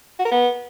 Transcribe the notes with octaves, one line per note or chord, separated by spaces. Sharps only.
F#4
A#4
B3